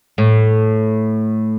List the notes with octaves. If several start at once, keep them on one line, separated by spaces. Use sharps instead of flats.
A2